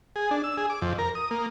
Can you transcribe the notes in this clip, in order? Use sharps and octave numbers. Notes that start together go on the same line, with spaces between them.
G#4
D4
E6
G#4
D6
F2
A#4
D#6
A#3